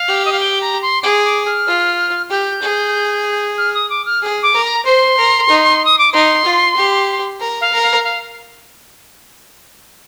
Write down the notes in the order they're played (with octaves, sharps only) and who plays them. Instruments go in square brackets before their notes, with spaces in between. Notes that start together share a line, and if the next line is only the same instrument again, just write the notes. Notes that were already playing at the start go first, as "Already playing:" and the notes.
Already playing: [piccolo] F5
[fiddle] G4
[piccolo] D#5
F5
G5
A#5
C6
[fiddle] G#4 [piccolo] D6
[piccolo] D6
F6
[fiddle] F4
[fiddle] G4 [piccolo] G6
[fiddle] G#4
[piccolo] F6
D#6
D6
F6
[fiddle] G#4
[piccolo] D6
[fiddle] A#4
[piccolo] A#5
[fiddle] C5 [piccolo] C6
[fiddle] A#4
D#4
[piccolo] D#6
D6
[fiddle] D#4 [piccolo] C6
[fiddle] F4
G4
A#4
[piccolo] F5
[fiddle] A#4
[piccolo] F5
F5